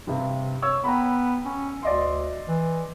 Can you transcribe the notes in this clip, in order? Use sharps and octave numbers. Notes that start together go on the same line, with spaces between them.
G2 C3
C#5 E6
B3 G5 A#5 B5
C#4
D2 D5 D#5 C6
E3